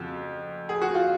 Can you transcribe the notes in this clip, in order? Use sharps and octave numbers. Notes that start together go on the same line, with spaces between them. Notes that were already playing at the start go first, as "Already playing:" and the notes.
Already playing: F2 C#3 F3 F#4
G#4
F#4
F4